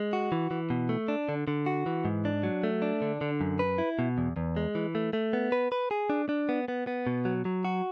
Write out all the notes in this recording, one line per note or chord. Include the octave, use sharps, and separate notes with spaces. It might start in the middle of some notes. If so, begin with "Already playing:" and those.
Already playing: G#3
F#4
E3
E3
B2
A3
D4
D3
D3
F#4
E3
G#2
D4
F#3
A3
D4
D3
D3
F#2
B4
E4
B2
E2
E2
G#3
E3
A3
A3
B3
B4
B4
G#4
D4
D4
B3
B3
B3
B2
F#3
F#3
F#4